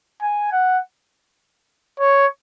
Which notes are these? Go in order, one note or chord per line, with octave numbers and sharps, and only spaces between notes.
G#5
F#5
C#5